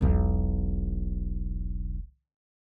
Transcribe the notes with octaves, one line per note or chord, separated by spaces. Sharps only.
E1 B1